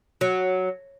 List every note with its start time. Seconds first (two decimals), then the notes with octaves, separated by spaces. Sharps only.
0.21 F#3